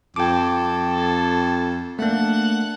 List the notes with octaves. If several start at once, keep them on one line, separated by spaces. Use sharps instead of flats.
F2 A4 G5 D6
A3 A#3 D4 F#5